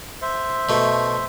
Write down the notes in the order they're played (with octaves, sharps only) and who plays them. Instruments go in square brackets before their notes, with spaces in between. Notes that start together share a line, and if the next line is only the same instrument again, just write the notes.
[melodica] C5 E5
[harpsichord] B2 A3